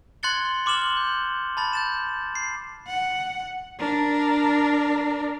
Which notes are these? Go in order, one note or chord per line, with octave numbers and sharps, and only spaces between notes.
C6 F#6 G#6 A6 C#7 G7
C6 D6 F6 E7 F#7 G7
G6
A5 B5 A6 F#7
G6 A6 E7
C7
F#5
D4 A#4